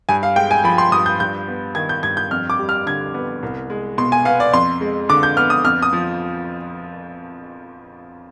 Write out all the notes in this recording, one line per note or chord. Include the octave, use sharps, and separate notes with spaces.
G2 G#5
F5
G#3 G5
G#5
F3 B5
C6
G2 D#6
G6
G2 G6
B3
D#3 G#6
G6
G2 G#6
G6
F2 F6
D6
G3
F6
D3 G#6
B3
C2
G#3
B2 C6
G#5
B3 F5
D5
F2 C6
G#3
D3 D6
G6
B3 F6
D#6
F2 F6
D#6
F3